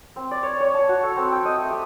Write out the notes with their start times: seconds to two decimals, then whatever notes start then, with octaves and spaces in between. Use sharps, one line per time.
0.16 C4
0.31 D5
0.43 C#5
0.60 C#5
0.74 A5
0.89 F#4
1.03 A4
1.16 C4
1.33 G5
1.45 D#5
1.58 A3
1.71 G4